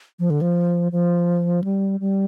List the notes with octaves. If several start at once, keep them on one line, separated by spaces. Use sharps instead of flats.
F3
D3
F3
F3
G3
G3